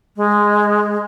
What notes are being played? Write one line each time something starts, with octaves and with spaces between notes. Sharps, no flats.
G#3